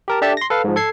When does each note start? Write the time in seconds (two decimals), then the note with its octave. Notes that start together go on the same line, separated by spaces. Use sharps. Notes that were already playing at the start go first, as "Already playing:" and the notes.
0.08 G4 A#4 A5
0.22 D4 G4 A4 D5 E5 A5
0.37 C6 A#6
0.50 A4 B4 F5
0.64 G#2 F3
0.76 A4 G#6 C7